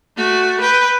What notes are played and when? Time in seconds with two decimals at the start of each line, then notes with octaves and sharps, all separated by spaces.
0.16 A3 F#4
0.61 B4 G5